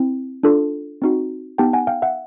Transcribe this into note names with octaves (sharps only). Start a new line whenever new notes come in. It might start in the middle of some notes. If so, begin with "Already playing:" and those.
Already playing: C4 E4
D4 F4 A4
C4 D#4 F#4
B3 D#4 G4 G5 A5
F#5 G#5
F5 G5
E5 F#5